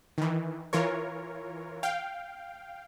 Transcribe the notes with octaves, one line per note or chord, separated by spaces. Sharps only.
D#3 E3
E3 F4 A#4 C#5
F5 G5